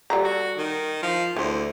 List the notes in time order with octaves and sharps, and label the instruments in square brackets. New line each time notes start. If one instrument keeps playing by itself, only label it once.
[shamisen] G3 A4 A#5
[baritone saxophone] F#4
D#3
F3
[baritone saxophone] D2 [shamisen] E3 C5